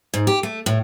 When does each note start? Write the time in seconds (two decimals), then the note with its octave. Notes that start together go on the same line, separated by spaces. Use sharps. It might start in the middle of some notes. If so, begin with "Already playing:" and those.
0.14 G#2
0.27 G4
0.43 A3
0.66 A2